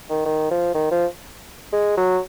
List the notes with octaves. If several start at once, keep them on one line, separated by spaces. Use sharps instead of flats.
D#3
D#3
F3
D#3
F3
G#3
F#3